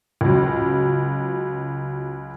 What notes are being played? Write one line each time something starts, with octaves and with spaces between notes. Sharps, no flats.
C#2 F#3